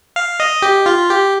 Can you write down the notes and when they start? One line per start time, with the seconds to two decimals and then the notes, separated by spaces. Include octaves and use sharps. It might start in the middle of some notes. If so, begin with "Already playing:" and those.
0.16 F5
0.40 D#5
0.62 G4
0.86 F4
1.09 G4